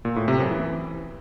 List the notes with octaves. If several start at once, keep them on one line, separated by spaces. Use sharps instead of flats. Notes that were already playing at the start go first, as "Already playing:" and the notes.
A#2
A2
C3
F#2
E3